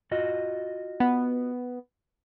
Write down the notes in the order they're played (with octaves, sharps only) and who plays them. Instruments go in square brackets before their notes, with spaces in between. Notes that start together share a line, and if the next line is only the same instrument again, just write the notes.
[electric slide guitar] F4 F#4 D#5
[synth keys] B3